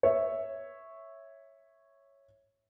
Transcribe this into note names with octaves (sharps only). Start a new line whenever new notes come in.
C#5 E5